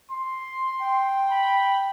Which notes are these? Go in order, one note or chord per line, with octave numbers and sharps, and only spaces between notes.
C6
G5
B5